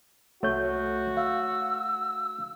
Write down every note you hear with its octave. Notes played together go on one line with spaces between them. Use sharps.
C2 A3 F#4 C#5 G6
F5 E6